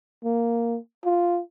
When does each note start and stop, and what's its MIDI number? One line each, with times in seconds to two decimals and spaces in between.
0.24 0.78 58
1.05 1.40 65